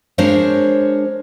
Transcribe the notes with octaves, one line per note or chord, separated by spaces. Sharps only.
G#3 D4 A#4 C5 C#5